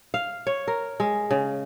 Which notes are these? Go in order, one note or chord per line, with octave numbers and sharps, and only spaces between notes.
F5
C#5
A#4
G#3
C#3